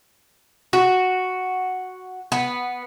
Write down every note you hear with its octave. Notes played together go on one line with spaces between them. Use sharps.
F#4
B3